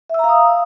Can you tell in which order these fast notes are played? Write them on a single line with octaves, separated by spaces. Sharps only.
E5 E6 A#5 F5 D#6